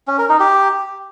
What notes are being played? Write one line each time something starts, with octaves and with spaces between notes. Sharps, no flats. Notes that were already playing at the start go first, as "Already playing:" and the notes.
C#4
A#4
D#4
G4